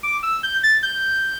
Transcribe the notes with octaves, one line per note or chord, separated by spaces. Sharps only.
D6
E6
G6
A6
G6